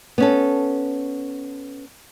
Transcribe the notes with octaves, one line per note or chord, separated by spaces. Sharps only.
B3 C#4 A4